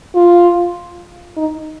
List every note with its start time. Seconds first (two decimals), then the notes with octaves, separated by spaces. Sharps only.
0.15 F4
1.37 D#4